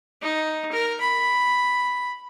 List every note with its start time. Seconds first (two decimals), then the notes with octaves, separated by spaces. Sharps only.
0.22 D#4
0.72 A#4
1.01 B5